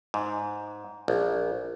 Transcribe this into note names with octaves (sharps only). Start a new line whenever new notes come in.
G#2
A#1